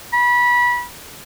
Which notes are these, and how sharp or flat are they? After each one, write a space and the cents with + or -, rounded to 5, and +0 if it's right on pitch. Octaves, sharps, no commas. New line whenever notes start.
B5 -25